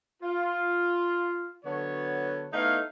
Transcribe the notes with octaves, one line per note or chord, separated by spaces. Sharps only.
F4
D3 F#3 B3 C#5
A3 B3 D#4 E4 C#5 F5